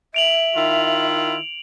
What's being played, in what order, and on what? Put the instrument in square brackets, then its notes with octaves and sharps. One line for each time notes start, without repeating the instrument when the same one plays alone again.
[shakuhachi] E5 [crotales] D7 F7 F#7
[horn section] D#3 E4 F4